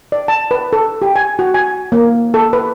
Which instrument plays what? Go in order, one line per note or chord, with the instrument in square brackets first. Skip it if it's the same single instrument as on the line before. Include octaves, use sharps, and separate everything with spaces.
[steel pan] D5
A5
B4
A4
G4
G#5
F#4
G#5
A#3
A4
B4